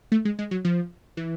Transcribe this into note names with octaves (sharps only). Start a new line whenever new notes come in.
A3
G#3
G#3
F#3
F3
E3